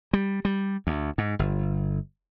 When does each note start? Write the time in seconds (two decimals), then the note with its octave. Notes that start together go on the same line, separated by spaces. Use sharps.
0.13 G3
0.45 G3
0.87 D2
1.18 G#2
1.39 G1